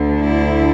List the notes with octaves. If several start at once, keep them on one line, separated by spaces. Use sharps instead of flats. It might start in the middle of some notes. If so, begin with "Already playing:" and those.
Already playing: D2 D3
E4